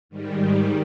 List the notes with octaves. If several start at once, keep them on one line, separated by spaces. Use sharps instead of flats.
G#2 D#3 G3